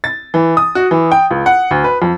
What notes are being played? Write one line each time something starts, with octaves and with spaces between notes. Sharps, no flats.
A6
E3
D#6
F#4
E3
G5
C#2
F#5
D2
B4
F2